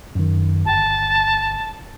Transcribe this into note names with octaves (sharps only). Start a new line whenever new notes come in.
F#2 D#3
G1 G5 A5